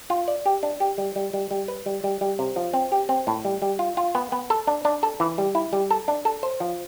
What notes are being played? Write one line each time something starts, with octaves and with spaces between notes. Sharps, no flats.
F4
D5
G4
D4
G4
G3
G3
G3
G3
B4
G3
G3
G3
C3
F3
C4
G4
C4
A2
G3
G3
F4
F4
B3
B3
A4
D4
D4
A4
E3
G3
E4
G3
A4
D4
A4
C5
F3